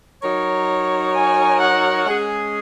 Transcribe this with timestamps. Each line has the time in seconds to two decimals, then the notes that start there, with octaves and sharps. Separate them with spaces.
0.22 F#3 D#4 A#4 C#5
1.15 G#5
1.60 F#5
2.07 G#3 C#4 G#4